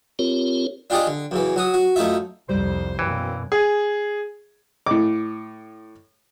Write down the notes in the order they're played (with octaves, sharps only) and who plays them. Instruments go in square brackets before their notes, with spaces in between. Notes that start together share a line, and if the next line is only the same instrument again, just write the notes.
[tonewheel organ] C4 F4 G4 A#4 C#5
[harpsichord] D4 F4 G4 G#4 D5 D#5
D3
F#2 C#3 E3
F#3 F#4 D#6
F#4
F#2 A3 D#4 F4 E5
[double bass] C2 F2 [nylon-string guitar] G3 [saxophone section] C5
[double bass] F#2 B2 [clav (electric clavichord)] E3 [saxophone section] A#3 C4 C#4
[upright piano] G#4
[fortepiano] A2 D6